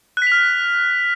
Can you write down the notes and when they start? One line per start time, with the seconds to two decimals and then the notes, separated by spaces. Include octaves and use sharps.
0.17 F#6
0.22 B6
0.27 F7
0.32 F6